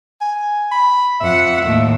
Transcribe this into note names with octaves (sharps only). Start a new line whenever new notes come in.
G#5
B5
F2 E5 F#5
D#2 A2